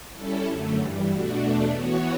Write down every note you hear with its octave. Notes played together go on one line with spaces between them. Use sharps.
G3 C#4 E4 A4
F#2 D3 F#3 A3
G2 E3 G3
B2 A3 D4 F#4
E2 B2 A3 D4
E3 B3 F#4 C#5